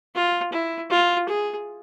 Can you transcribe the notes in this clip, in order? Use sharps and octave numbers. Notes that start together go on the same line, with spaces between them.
F4
E4
F4
G#4